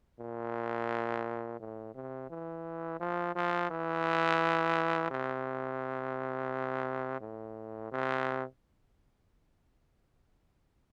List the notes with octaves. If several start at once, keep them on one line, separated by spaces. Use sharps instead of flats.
A#2
A2
C3
E3
F3
F3
E3
C3
A2
C3